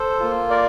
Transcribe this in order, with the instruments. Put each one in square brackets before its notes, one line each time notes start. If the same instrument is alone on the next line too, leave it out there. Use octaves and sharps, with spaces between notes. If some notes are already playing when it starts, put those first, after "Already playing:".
Already playing: [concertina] A4 C5
A#3 F4
A#4 D5